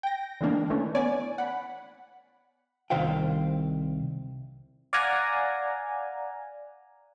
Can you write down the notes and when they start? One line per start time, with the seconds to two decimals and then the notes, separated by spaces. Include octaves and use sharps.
0.03 G5 A#6
0.41 D3 E3 G#3 A#3 D4
0.70 D#3 E3 A3 C#4
0.95 B3 C#5 D5 G#5
1.38 F#5 B5
2.90 C2 D#3 C5 F5 G5
4.93 D5 F5 F#5 G#5 A#5